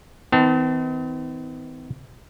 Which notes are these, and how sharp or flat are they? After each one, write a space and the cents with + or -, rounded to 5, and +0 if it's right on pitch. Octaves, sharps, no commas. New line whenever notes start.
D#3 +40 C4 -45 A5 +0